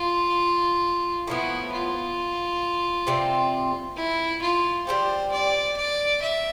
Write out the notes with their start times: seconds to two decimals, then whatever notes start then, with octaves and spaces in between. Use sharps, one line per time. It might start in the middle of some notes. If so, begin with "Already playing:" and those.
Already playing: F4
1.27 A2 F3 B3 E4
1.72 F4
3.07 C3 G3 C4
3.97 E4
4.42 F4
4.87 G3 C4 G4 C5
5.32 D5
5.77 D5
6.22 E5